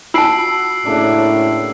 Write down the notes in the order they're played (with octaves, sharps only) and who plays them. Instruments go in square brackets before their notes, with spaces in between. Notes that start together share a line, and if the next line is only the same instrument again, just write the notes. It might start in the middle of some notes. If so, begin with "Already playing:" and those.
[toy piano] F4 A5 [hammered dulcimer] F#4 F#5 [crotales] E6 C7 D7
[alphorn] A2 [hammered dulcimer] C#3 A#3 D4